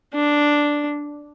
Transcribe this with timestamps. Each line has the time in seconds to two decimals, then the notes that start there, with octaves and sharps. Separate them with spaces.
0.14 D4